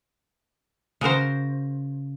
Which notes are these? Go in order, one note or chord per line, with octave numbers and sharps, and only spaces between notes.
C#3 F#4 A#4 C5